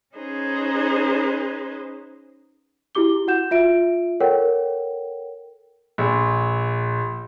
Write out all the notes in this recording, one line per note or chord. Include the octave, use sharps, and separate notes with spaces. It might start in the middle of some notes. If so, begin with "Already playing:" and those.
C#4 D#4 G#4 B4 C5
E4 F#4 G4 D6 G7
F#4 F#5 G6 E7
F4 E5 D7
A4 A#4 C#5 F#5 G5
A#1